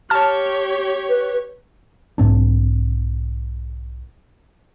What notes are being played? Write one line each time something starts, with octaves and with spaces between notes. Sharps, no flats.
G4 C#5 A5 F6
B4
B1 G#2 C4 D4